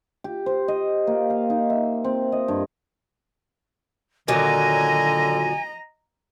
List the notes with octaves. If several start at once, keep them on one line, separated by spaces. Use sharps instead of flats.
G4
C5
D#5
A#3
F5
D#4
E5
C4
D#5
G2
A#2 D3 D#3 F#3 D#5 G#5 A#5